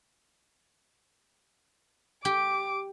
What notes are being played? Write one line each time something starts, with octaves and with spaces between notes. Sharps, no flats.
G4 D6